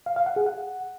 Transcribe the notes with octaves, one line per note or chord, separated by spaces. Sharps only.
F5
F5
F#5
G#4
F#5